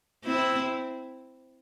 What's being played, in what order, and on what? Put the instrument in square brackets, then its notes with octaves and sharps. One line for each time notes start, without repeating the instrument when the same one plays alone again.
[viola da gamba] C4 E4